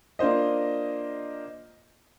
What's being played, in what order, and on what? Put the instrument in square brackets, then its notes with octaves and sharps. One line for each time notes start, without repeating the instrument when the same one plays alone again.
[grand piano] A#3 D4 F4 C5 D#5